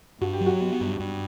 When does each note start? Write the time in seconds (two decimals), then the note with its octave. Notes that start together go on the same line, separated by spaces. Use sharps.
0.21 G2 F#4
0.33 G4
0.41 F#3
0.46 F#4
0.61 B3
0.81 G2
1.00 G2